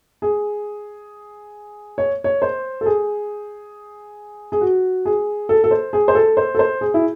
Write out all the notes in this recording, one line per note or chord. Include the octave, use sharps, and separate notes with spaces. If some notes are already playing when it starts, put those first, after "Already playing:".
G#4
C#5
C#5
C5
A4
G#4
G#4
F#4
G#4
A4
A4
C5
G#4
C5
A4
C5
A4
C5
G#4
E4